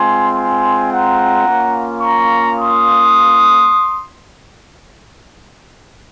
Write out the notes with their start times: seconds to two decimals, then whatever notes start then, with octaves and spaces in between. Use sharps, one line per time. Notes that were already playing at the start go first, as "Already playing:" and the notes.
Already playing: G#3 C4 F4 G#5 C6
0.35 G#5 C6
0.90 F#5 A#5
1.47 A#3 C#4 F4
2.02 A#5 C#6
2.58 C6 D#6